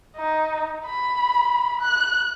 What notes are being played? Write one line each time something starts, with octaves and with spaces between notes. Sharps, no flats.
D#4
B5
F#6